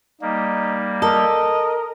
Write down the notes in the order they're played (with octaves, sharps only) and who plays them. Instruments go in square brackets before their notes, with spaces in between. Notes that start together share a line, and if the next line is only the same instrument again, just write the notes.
[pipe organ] G3 A#3 [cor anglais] D#4
[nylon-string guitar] A4 [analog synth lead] A#4 [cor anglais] D#5